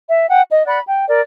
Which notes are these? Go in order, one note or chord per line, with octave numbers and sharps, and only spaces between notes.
E5
F#5 G5
D#5
D5 F#5 B5 F#6
G5
A#4 D5